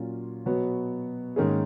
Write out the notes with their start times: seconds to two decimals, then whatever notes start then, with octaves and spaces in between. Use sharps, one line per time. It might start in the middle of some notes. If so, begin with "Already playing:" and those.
Already playing: A#2 F#3 C#4 F4
0.46 B2 F#3 B3 F#4 C#5
1.36 G#2 D#3 A#3 C#4 G#4